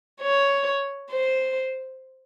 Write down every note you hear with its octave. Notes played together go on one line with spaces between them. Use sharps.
C#5
C5